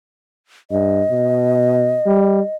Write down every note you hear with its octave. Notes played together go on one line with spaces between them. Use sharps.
G2 D#5
B2
G3